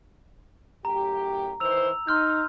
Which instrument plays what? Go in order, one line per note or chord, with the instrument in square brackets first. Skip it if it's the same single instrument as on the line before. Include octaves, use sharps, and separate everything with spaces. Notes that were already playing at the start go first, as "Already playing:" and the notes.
[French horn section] F#2 A2 G4 [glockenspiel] A#5
[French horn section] D#3 E3 C5 [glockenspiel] E6 F7
[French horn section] D#4 [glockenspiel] C6 F6 G6